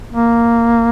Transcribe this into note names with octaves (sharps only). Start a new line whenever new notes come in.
A#3